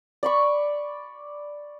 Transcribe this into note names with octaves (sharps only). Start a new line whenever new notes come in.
D5 B5 C#6